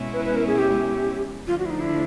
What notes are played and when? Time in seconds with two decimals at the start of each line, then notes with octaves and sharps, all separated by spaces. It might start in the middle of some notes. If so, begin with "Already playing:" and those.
Already playing: B2 G#3 C#4 E4
0.13 B4
0.25 B4
0.35 A#4
0.47 G#4
0.58 G4
1.47 D3 F3 A3 D4 F4
1.59 F#4
1.65 E4
1.70 D#4
1.80 E4